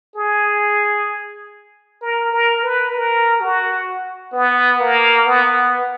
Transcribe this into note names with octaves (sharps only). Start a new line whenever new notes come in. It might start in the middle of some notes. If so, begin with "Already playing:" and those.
G#4
A#4
A#4
B4
A#4
F#4
B3
A#3
B3